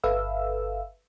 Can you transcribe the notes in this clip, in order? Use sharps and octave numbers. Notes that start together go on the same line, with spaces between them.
G1 A4 B4 E5 F5 E6